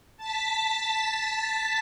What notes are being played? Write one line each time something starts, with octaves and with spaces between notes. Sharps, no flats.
A5 A6 B6